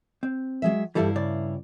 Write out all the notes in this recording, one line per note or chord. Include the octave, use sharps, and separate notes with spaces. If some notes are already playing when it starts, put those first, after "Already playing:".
C4
F#3 G#3 E5
G2 E3 G3 E4 A4 F5
C#3 D5